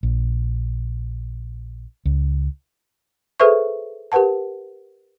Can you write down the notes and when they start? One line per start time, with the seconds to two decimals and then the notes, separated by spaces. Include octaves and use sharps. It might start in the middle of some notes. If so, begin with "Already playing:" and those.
0.03 A#1
2.05 C#2
3.40 G#4 A4 B4 C5 E5 C#6
4.12 G4 A#4 B4 F#5 A5